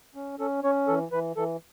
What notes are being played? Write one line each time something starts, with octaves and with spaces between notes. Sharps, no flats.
C#4
C#4 A4
C#4 C#5
E3 A4
E3 B4
E3 A4